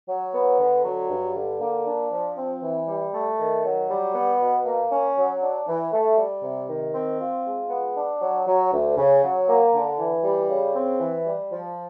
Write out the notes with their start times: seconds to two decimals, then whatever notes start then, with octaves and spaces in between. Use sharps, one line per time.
0.08 F#3
0.34 B3
0.59 D3
0.85 F#3
1.10 G2
1.35 D3
1.61 A#3
1.86 D4
2.11 F3
2.37 C4
2.62 E3
2.87 G3
3.13 A3
3.39 D#3
3.64 F#3
3.89 G3
4.14 B3
4.39 B2
4.65 A#3
4.91 C#4
5.17 F#3
5.41 D4
5.67 E3
5.92 A3
6.18 G3
6.42 C3
6.68 D#3
6.94 C4
7.19 F4
7.45 G#3
7.70 B3
7.95 D4
8.21 F#3
8.46 F#3
8.72 D2
8.97 C#3
9.22 F#3
9.47 A#3
9.73 D3
9.98 E3
10.24 G3
10.49 C#3
10.75 C4
11.00 E3
11.25 G3
11.51 F3